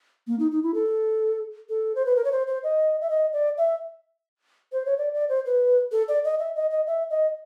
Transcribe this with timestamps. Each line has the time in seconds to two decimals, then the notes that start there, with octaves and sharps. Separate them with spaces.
0.27 A#3
0.39 D#4
0.51 D#4
0.63 E4
0.74 A4
1.69 A4
1.95 C5
2.06 B4
2.16 A#4
2.25 C#5
2.32 C5
2.47 C5
2.63 D#5
3.01 E5
3.10 D#5
3.33 D5
3.58 E5
4.72 C5
4.86 C#5
4.98 D5
5.14 D5
5.29 C5
5.46 B4
5.92 A4
6.08 D5
6.24 D#5
6.39 E5
6.56 D#5
6.70 D#5
6.87 E5
7.10 D#5